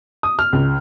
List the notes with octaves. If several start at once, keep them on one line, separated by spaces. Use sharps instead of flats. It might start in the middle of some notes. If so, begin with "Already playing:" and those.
D#6
F6
C#2